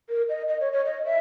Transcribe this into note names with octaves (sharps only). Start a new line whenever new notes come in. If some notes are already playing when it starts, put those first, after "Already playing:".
A#4
D#5
D#5
C#5
C#5
D#5
E5